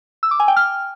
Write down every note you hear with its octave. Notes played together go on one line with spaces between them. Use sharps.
E6
D6
G#5
G5
F6